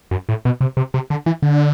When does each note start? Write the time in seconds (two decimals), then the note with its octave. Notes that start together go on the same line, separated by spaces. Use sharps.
0.11 F#2
0.29 A2
0.45 B2
0.61 C3
0.77 C3
0.94 C3
1.10 D3
1.26 E3
1.42 D3